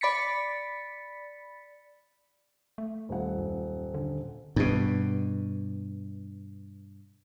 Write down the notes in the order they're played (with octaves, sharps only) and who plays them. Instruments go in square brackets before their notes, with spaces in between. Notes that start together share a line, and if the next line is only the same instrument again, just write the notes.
[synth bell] D5 B5 A6 B6 C#7
[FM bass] A3
[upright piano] D#1 F#5
[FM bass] F#2
D3
[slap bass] G2 B2